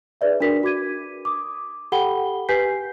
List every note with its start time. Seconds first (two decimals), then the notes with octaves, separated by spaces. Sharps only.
0.21 D#4 G#4 B4 D5 E5
0.40 D4 F#4 A#4 B6
0.63 F#4 D6 G#6 D#7
1.25 D6 D#6
1.92 G4 A4 F#5 G5 B5 G7
2.49 G4 B4 G#5 G6 B6 C7